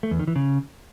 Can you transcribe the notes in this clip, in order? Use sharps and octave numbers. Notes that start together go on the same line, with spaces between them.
A3
E2
D#3
E3
C#3